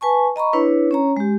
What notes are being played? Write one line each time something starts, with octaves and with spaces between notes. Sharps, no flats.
B4 G#5 A5 C#6
D#5 A#5 B5 C#6
D4 E4 B4 C#5
C#4 C#5 A#5
G#3 G4